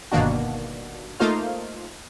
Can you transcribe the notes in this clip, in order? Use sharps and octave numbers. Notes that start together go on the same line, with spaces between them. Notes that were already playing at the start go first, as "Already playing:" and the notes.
G1 B2 D#3 A#3 D4 F#4
A3 A#3 D#4 F4 C5 F5